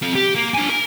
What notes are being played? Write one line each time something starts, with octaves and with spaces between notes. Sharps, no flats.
C4 F4
G4
A#3
D4 G#5
A#4